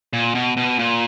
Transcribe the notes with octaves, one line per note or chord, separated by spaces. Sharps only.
A#2
B2
B2
A#2